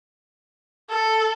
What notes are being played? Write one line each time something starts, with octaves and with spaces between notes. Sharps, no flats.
A4